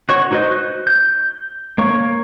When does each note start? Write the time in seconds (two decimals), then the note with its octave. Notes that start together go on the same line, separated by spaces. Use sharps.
0.09 F#4 C#5 C#6
0.31 D#4 F#4 B4 C5 D#5
0.51 F#6
0.87 G6
1.78 A#3 C#5 C#6